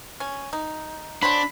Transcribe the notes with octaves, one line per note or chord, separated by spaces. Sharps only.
C#4
D#4
F#3 D4 C5 F#5 B5